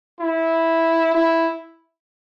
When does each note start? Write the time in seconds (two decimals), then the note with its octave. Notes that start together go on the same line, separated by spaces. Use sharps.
0.20 E4
1.15 E4